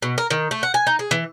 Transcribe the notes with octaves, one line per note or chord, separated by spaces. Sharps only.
B2
A#4
D#3
A3
F#5
G#5
D#4
G#4
E3